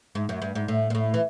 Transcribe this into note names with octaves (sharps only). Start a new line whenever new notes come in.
G#2
F#2
G2
G#2
A2
A#2
A2
E3